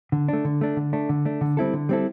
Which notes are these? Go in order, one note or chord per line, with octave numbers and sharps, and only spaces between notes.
D3
A3 D4
D3
A3 D4
D3
A3 D4
D3
A3 D4
D3
G3 C4 E4 A4
D3
G3 C4 E4 A4